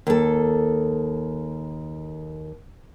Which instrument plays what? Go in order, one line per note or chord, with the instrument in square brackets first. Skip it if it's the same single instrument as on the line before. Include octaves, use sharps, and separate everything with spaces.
[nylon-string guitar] D#2 A4